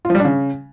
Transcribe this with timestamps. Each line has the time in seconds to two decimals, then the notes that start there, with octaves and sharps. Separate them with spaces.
0.05 F4
0.10 F3
0.15 G3
0.20 D4
0.25 C#3